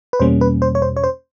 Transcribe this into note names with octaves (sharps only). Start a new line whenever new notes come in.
B4
E2 B2 G3 A#3 C#4 C5
B4
C5
C#5
C5
C#5
C5